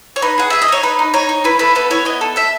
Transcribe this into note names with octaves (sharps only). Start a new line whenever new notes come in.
C#5
D#4 B4
G#4 F#5
G#4 E5
D#5
D#4 C#5
D#4 B4
D#4
D#4 C#5
D#4
E4 B4
A4 B4
B3 B4
E4 C#5
B3 D#5
A4
A4 E5